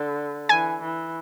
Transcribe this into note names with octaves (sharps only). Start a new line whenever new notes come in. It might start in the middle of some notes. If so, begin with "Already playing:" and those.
Already playing: D3
E3 G#5
E3